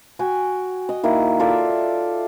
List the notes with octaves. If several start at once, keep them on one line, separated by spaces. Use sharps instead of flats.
F#4 G5 G#5
D#5
D#3 A#3 E4
F4 A4 D5 E5